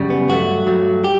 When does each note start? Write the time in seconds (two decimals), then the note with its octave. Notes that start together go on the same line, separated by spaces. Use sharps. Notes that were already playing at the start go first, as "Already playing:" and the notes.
Already playing: F#2 C#3 G3
0.10 B3
0.29 G2 F#3 A3 F#4
0.66 G2 F#3 A3
1.04 G4